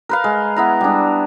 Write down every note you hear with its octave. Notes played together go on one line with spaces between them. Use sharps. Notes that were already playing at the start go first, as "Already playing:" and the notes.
A#4 B4 F5
G#3
B3 E4 A#5
G3 D4